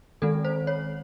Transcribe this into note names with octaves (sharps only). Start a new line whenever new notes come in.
D#3 G#3 C4 A4
C5
C#5